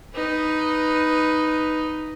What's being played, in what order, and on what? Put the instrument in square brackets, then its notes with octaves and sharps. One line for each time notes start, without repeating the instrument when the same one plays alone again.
[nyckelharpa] D#4 B4